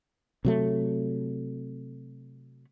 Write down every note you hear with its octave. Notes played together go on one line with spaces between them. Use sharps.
C3 F#3 A3